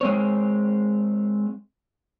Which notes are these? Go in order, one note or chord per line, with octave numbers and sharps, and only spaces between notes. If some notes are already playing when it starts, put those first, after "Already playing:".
G#3 C4 C#5